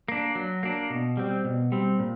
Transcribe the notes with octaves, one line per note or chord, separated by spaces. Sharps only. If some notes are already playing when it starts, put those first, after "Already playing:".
A#3 D4
F#3
A#3 D4
B2
G3 C4
B2
G3 C4
A#2